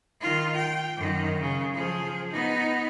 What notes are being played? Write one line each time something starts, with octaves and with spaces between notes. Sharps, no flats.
D#3 F4
G5
F#2 D#3
C#3
F3 G#4
B3 D#4